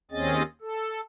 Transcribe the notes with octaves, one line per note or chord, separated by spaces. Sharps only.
D#2 C4 C#4 G#4 D#5 A6
A4